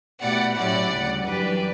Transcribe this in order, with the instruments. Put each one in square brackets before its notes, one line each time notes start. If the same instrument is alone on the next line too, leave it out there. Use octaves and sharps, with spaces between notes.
[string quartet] B2 A3 E4 G4 [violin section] D5 F#5
[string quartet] A2 F#3 C#4 E4 G4 [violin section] D5 F#5
[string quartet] D2 C#3 G3
[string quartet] F#2 E3 G3 D4 G4 [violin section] B4 D5